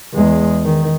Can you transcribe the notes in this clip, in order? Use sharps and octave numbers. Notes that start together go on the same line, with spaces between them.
E2 G#3
D#3